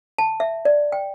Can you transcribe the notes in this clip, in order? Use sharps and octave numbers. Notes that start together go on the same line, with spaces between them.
A5
E5
D5
G5